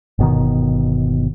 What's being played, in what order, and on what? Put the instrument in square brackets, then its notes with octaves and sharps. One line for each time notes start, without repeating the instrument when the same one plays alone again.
[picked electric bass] G1 B2 D#3